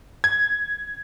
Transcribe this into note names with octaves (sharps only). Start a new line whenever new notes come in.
G#6